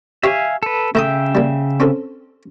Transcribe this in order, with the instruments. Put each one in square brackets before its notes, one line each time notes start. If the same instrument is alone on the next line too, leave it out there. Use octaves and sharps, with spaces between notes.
[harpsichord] G4 C#5 [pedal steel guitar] E5 F5 G#5
[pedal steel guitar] A4 B4
[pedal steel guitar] C#3 E5 G5 [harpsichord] A3 A#5 D#6
[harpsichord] G3 A#3
C4 C#4 A4